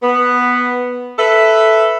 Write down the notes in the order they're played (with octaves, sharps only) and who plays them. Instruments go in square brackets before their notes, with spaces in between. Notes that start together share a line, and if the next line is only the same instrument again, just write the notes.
[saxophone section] B3
A4 B4 E5